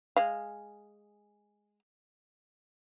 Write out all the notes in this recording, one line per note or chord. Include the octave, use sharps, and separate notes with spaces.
G#3 F5